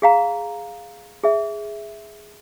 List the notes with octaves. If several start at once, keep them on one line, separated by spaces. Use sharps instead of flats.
G#4 F5 A#5
G#4 E5